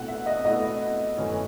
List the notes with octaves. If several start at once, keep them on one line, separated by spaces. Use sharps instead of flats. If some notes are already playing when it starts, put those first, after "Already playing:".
Already playing: B2 A3 E4 F#5
E5
D#5
B2 A3 E4 D#5
F#2 E3 A3 C#4 E4